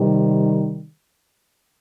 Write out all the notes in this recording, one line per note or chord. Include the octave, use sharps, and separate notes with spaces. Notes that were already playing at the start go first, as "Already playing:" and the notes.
Already playing: C3 D#3 G3